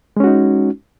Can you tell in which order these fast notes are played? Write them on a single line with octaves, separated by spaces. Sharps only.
G#3 C#4 F#4 D#4